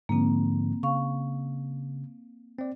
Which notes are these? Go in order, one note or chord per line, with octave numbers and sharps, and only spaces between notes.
G#2 D3 F3 A#3 C4
C#3 F5 C#6
C4 D5